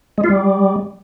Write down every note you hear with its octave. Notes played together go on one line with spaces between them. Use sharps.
G#3
F4
G3